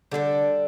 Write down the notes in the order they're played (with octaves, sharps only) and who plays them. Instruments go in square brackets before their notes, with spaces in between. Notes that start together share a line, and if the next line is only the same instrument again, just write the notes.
[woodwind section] D3 [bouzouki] G3 D4 A4